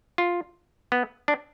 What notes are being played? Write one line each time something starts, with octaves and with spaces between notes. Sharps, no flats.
F4
B3
D4